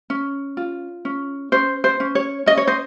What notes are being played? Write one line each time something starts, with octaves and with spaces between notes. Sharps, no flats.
C#4
F4
C#4
C#4 C5
C5
C#4
C#5
C#4 D#5
C#5
C5 D#5